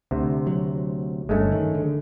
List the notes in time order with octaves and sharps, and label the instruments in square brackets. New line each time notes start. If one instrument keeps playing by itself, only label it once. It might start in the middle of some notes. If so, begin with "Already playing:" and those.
[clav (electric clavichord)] D2 C3
[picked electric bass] F#3
[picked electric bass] G1 G2 [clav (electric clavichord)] G#3 A3 C#4
[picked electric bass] D#3
D3